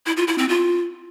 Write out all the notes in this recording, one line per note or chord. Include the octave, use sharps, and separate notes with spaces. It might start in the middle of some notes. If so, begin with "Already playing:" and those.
E4
F4
E4
C4
F4